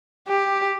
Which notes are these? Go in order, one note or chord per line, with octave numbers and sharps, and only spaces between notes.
G4